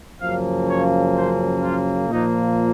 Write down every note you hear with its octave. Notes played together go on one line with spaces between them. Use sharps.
F#2 C#3 F3 A#3 F5
C#5
C5
F4
A#2 F3 A#3 D#4